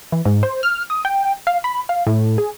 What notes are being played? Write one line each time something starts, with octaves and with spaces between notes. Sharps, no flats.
E3
G#2
C5
F6
D#6
G5
F5
B5
F5
A2
G#4